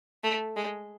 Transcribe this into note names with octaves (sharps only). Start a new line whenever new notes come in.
A3
G#3